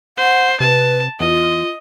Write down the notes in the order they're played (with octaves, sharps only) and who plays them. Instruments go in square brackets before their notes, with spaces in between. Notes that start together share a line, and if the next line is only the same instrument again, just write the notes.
[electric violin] C5 [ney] F#5
[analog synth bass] C3 [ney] B4 [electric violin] A5
[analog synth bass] E2 [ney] F4 [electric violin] D#5